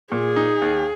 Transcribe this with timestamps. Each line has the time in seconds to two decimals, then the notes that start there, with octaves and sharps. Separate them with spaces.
0.12 A#2 G#4
0.36 D#4
0.62 D#2